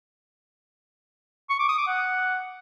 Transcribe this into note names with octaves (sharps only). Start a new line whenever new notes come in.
C#6
D6
D#6
D6
F#5